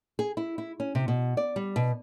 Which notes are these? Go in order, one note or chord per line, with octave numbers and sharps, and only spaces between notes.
G#4
E4
E4
C#4
C3
B2
D5
G3
B2